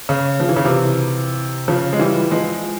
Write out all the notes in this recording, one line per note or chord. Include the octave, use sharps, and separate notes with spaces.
C#3
F3
E3
C#3
C3 E3
C#3 F3
G#3
E3 G3
F3 G#3